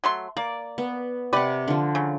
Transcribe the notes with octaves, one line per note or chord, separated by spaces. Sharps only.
F#3 A3 C6
A#3 D5
B3
C3 G4 B4 D5 F#5
D3 F3
C#3 F#3